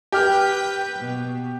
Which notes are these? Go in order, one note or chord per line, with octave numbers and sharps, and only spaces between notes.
G4 B4 G5 F6
B2